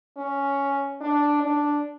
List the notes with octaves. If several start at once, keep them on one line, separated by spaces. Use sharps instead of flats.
C#4
D4
D4